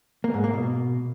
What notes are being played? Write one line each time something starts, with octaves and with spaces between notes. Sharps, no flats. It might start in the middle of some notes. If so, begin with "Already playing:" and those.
A#3
G#2
A#3
B2